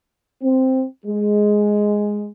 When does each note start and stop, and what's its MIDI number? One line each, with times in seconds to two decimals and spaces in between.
0.42 0.83 60
1.06 2.28 56